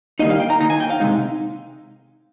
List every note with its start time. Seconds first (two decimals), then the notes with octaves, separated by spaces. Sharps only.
0.19 D#3 G3 A#3 D#4 D#5
0.30 F5
0.40 G5
0.50 A#5
0.60 D#3 A#3 D#4 A#5
0.70 G#5
0.80 G5
0.90 F5
1.00 C3 D#3 G#3 D#4